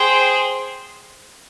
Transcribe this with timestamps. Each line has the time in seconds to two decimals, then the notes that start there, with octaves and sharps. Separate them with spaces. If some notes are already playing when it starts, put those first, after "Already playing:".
Already playing: G#4 C5 G5